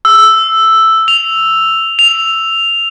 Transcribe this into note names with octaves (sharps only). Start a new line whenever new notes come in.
E6
F7
F7